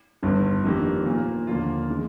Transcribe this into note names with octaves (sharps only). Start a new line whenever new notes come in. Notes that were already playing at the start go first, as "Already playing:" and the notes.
G1 G2 D#3
F2 D#3 A#3 D4 G4
A#2 F3 A#3
D#2 D3 F3 A#3 F4
D#3 G#3